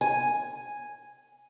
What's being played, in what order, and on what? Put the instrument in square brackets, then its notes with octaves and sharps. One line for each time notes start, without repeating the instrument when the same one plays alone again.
[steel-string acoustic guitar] G#5